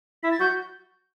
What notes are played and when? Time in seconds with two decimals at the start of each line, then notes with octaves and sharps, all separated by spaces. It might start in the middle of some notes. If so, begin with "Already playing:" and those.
0.23 E4 B6
0.31 A6
0.40 F#4 G6